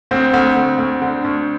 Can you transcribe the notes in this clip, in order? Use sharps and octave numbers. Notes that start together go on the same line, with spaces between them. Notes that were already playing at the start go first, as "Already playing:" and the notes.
D2 C4
D2
D2
D2
D3
D2